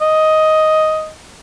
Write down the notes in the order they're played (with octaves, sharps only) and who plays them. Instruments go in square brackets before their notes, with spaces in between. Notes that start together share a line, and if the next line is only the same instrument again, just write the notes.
[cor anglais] D#5